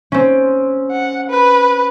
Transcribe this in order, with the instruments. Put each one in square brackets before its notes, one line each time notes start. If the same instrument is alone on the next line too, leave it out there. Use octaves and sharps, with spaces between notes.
[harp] C4 C#4
[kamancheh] F#5
B4